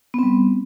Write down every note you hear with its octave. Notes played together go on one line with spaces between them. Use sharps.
G3 B3 C4